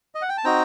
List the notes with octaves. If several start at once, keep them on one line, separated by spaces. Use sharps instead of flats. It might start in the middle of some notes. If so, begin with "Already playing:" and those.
D#5
F#5
G5
A5
C4 D#4 F#4 G5 A#5